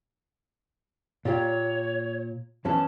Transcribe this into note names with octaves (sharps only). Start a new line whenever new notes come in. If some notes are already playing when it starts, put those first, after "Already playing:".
A#2 F4 G4 C#5
F#2 E3 C#4 A5